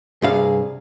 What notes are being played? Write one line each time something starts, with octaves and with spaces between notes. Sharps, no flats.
C2 G2 G#4 F5